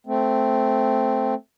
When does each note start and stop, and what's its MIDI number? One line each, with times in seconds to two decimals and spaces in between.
0.06 1.34 57
0.06 1.34 60